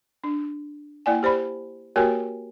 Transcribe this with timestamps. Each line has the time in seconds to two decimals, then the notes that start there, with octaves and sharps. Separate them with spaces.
0.24 D4
1.06 A#3 E4 D5 F#5 G#5
1.23 G4 C5 D5 B5
1.96 A#3 F#4 G4 A#4 C#5 G#5